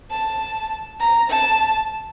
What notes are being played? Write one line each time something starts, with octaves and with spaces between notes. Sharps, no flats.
A5
A#5
A5